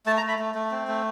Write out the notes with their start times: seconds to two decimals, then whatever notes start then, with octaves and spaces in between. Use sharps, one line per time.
0.06 A3 A5
0.17 A#5
0.22 A3
0.28 B5
0.39 A3
0.55 A3
0.71 C4
0.88 A3